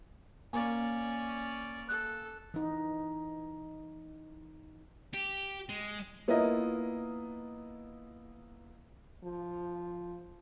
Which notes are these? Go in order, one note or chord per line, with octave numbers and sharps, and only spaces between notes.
A#3 C#4 D5 G#5
A4 F#6
E3 D#4
G4
G#3
A#3 B3 E4 F4 A#4 D#5
F3